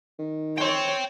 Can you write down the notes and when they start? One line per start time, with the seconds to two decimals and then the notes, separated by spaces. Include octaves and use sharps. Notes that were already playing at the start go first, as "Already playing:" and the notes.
0.19 D#3
0.58 C#5 G5 C6